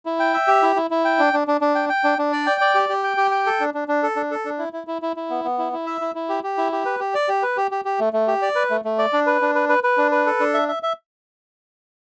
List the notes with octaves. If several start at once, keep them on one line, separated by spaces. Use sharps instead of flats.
E4
G5
E5
G4
E4
E4
E4
G5
D4
D4
D4
D4
G5
G5
D4
D4
D5
G5
D5
G4
G4
G5
G4
G5
A4
D4
D4
D4
A4
D4
A4
D4
E4
E4
E4
E4
E4
B3
B3
E4
E4
E5
E4
E4
G4
G4
E4
G4
B4
G4
D5
G4
B4
G4
G4
G4
A3
A3
G4
D5
B4
A3
A3
D5
D4
B4
D4
B4
B4
B4
D4
B4
A4
D4
E5
E5
E5